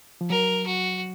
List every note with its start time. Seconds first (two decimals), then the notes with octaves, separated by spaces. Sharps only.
0.21 F3
0.30 F#3 A#4
0.67 F#4